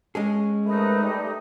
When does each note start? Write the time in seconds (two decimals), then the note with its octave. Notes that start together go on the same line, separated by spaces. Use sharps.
0.15 G#3 C#4 G#4
0.67 G#2 A3 D#4 A#4 B4
1.02 G3